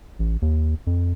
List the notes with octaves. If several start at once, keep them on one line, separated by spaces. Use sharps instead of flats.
A1
D#2
F2